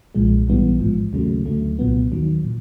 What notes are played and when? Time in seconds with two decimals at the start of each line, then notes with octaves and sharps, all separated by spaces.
0.15 B1 A#2 F3 G#3
0.47 A#1 G#2 E3 G3 B3
0.80 A1 G#2 F3
1.13 D#2 C#3 F#3 A3
1.46 D2 D3 F#3 A3
1.79 C2 A#2 F#3 B3
2.12 D#2 D#3 F#3
2.44 A#2